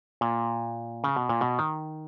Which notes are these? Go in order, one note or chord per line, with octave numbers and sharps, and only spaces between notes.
A#2
C#3
B2
A#2
B2
D#3